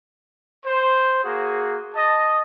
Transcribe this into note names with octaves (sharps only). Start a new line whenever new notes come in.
C5
A#3 F#4 G#4
D#5 A5